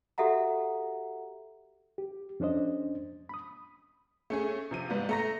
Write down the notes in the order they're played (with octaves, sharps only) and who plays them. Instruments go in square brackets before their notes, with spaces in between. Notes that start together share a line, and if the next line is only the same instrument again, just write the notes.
[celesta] F#4 G4 A4 E5 F#5 A#5
[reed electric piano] G4
F2 C#4 D4 C5 D#5
B5 D#6
[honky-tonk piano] A3 C#4 G#4
C3 F3 D#7
G#2 G3 B3 F4
A3 A#5 A#6